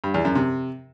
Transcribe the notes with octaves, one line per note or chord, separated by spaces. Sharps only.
G2
E2
F#2
C3